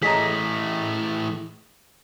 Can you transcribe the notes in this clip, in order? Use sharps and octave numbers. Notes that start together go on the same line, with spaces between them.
E3 A3 G#4 D#5 A#5 B6